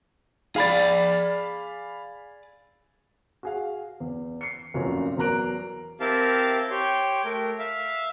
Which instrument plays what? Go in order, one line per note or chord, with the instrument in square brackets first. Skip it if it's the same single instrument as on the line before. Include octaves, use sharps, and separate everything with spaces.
[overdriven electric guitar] G#4 D5 [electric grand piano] F5 B5 A6
[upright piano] F#4 G#4 F5
E2
C7 C#7
F1 F#2 A#2 C#5
E2 F#3 A#4 A#5 F#6 D7
[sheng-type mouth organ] C4 E4 G4 A#4 F5 A5
G4 C#5 G5 C6
A3 A#4
E5 F5